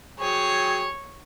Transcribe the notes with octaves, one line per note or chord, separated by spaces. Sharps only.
F#3 G4 G#4 C#5